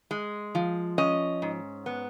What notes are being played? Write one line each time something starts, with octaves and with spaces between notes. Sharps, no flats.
G#3
F3
C#4 D#5
G#2
B3